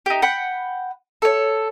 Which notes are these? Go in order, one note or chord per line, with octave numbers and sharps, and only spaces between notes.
D#4 G4
F#5 G5 B5
A4 C#5